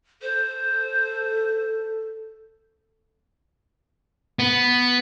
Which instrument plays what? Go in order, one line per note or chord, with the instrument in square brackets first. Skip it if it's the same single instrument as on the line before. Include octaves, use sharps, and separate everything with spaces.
[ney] A4 [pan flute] C5
[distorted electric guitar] B3